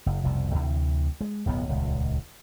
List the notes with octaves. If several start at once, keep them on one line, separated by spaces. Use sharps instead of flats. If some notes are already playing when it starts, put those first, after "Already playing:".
F#1
F1 C2 B2
D2 C3 E3
G#3
D1 B1 F2 B3
D#1 C#2